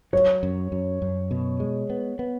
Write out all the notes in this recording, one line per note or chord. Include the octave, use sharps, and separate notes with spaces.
F#3 C#5
F#2
F#2
F#2
B2
G#3
B3
B3